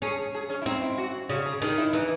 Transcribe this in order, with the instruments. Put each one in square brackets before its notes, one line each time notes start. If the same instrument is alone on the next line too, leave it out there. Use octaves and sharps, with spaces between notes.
[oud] C#4 [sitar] G#4
[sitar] G#4
C#4
E4
[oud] C4 [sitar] D#4
[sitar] E4
F#4
[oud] C#3 [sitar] F#4
[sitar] G#4
[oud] D#3 [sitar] G#4
[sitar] E4
[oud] E3 [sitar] D#4